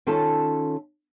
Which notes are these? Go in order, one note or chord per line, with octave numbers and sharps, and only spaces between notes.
D#3 C#4 F4 A4 A5